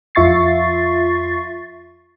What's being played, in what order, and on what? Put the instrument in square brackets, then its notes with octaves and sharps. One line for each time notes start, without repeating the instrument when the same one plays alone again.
[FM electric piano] F2 F4 E5 C#6 A6 C7